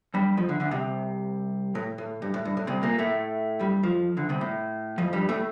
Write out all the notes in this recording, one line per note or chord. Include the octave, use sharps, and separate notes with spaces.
G2 G3
F2 F3
D2 D3
D2 D3
C2 C3
A2
A2
G2
A2
G2
A2
C2 C3
A#2 A#3
A2 A3
G2 G3
F2 F3
D2 D3
C2 C3
A2
F2 F3
G2 G3
A2 A3